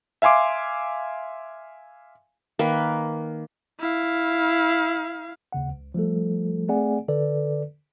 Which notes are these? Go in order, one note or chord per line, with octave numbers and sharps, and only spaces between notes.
E5 F5 G#5 C6 D6
D#3 A#3 B4
E4 F5
D#2 C#3 F#5
C#2
F3 G3 A3 A4
A3 C4 G#4 D5 F#5 G#5
D3 A4 B4 D5